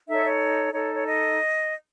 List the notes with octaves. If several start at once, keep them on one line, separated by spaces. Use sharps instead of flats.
D#4 A4 C#5 E5
C#5
D#4 A4 C#5
C#5
D#5